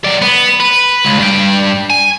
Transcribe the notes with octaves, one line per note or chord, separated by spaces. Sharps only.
F#3 D5
B3
B4
C#2
G2 G5
G#5